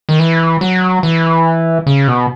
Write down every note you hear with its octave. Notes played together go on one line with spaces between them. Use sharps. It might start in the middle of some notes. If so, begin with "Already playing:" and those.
D#3
E3
F#3
E3
C#3
B2